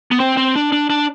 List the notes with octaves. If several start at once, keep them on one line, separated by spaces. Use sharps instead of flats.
B3
C4
C4
D4
D4
D4